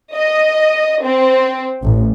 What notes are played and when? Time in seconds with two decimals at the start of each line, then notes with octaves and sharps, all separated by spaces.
0.14 D#5
1.03 C4
1.84 A1